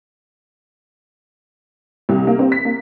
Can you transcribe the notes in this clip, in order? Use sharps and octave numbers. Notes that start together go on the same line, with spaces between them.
C2
A#3
C4
B6
A#3